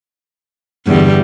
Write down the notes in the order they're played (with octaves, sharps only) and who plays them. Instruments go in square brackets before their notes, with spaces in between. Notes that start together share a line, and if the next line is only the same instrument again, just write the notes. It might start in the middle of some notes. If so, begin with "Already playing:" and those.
[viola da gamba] E2 G3 [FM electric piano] G2 D3